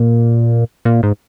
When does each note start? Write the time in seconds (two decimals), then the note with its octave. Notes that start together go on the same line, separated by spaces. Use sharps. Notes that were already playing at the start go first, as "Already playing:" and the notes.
Already playing: A#2
0.85 A#2
1.03 G#2